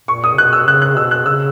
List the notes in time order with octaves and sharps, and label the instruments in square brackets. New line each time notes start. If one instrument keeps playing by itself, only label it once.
[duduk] A#2 [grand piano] C#6
[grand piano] D#6
[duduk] C#3
[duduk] B2 [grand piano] F#6
[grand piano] E6
[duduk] C#3 [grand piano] F#6
[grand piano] F#6
[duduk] B2 [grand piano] E6
[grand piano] F#6
[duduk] C#3 [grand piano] E6